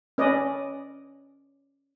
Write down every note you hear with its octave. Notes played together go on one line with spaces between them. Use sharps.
C#4 B4 D5 D#5